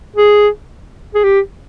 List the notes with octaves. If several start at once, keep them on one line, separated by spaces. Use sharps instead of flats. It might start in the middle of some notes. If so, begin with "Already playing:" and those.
G#4
G#4
G4